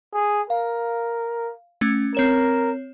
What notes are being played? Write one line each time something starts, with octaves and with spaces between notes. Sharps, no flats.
G#4
A#4 F5
A3 C#4
C4 A#4 C#5 E7